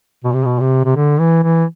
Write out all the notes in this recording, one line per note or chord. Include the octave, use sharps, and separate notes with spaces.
B2
C3
B2
C3
C3
D3
E3
E3